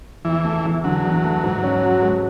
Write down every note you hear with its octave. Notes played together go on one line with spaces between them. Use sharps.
E2 E3
A3
E2
D3 F#3
E2
A3
G#2
C#4
F#4
G#3